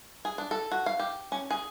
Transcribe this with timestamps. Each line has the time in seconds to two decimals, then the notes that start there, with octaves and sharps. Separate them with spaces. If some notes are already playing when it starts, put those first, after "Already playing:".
0.25 G#4
0.38 D4
0.51 A4
0.71 F#4
0.86 F5
0.99 G4
1.32 C#4
1.50 G#4